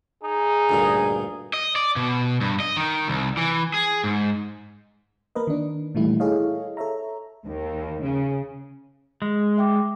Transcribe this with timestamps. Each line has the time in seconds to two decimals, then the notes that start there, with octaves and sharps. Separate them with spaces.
0.23 D#4 G#4
0.69 D2 G2 A#2
1.54 D#5
1.76 D5
1.96 B2
2.41 G2
2.60 D#5
2.77 D#3
3.08 C2
3.37 E3
3.74 G#4
4.04 G#2
5.35 A#3 A#4 B4 D#5
5.47 D#3 D4
5.95 A#2 D#3 E3 G3 A3 E4
6.20 E4 G#4 A4 C#5 D#5 F5
6.77 A4 C#5 E5 A#5
7.46 D#2
8.03 C#3
9.22 G#3
9.57 E5 G5 D6